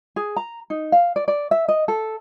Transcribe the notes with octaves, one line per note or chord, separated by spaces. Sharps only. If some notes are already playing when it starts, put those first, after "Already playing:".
G#4
A#5
D#4
F5
D5
D5
E5
D#5
A4